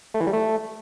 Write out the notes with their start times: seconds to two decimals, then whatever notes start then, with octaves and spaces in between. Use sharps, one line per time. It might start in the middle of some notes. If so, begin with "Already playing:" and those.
0.14 A3
0.21 E3
0.27 G3
0.33 A3